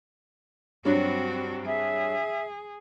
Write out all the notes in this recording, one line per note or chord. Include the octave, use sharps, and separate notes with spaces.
G2 F#3 C4 D4 F#4
G#4 E5